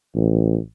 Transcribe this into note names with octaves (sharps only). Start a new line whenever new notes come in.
A1